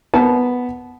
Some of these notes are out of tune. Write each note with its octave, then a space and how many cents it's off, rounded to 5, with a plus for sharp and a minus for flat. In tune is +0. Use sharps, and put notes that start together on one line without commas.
B3 +0 A5 -25